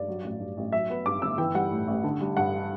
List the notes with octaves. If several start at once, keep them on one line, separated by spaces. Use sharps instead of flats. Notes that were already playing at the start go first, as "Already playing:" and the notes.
Already playing: G2 D5
F#3
A1
G2
A1
F#3 E5
B3
G2 D6
G1 E6
E3 G5
G3 F#5
A2
A1
D3
G3
G2 F#5